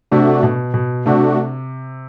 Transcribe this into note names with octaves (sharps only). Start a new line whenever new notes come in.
C3 A3 D4 F#4
B2
B2
C3 A3 D4 F#4